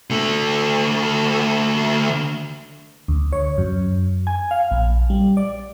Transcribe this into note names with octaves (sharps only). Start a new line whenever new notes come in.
D3 A3
D2
C#5
F#2
G#5
F5
A#1
G3
D5